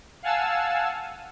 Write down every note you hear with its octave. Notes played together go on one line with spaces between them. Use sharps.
F5 F#5 G#5 A5 E6